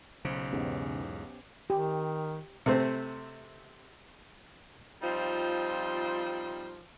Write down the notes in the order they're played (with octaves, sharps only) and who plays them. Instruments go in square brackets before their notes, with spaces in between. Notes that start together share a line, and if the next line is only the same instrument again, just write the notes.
[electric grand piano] B1 [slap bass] C#3 [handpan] C5
[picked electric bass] E2 G#2 [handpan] B3 C#4 G4
[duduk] D#3 [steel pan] G4
[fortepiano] C3 A3 C4
[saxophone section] F3 G3 C4 D#4 F4 C5